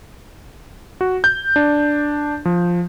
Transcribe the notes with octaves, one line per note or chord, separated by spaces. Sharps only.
F#4
G6
D4
F3